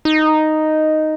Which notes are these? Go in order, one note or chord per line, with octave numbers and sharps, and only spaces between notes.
D#4